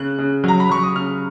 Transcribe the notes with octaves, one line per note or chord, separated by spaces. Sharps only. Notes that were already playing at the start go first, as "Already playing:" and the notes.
Already playing: C#3 F#6
C#3
F#3 A#5
B5
F#3 C#6
D#6
C#3 F6